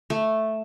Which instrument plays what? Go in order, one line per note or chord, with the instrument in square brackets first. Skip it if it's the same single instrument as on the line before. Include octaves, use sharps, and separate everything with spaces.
[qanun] A3